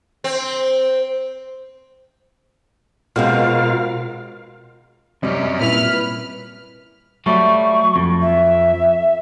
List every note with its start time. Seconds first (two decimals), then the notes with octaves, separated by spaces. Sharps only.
0.24 C4
3.16 B2 G#3 C4 F4 A#4 F5
5.23 F#2 C3 G3 C#4 D5 D#5
5.61 A#2 E4 B4 F6
7.26 F#3 G3 A3 C#6
7.96 F2
8.22 E5